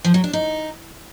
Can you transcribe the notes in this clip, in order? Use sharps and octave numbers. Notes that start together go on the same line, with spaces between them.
F3
F#3
D4
D#4